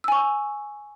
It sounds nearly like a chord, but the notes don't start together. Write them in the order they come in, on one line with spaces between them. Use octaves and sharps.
E6 G#5 C#6